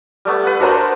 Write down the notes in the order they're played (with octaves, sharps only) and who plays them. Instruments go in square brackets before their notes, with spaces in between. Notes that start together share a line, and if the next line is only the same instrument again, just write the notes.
[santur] G3 A3 B3
B4 F#5
[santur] D4 F#5 [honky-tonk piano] F#4 A#4 C5